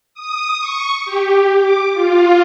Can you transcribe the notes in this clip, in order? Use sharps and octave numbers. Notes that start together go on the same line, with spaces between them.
D#6
C#6
G4
D6
F4